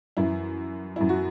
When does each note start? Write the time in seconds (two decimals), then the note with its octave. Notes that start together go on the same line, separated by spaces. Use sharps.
0.17 F#2 E3 E4
0.96 F#2 E3 E4
1.09 F#4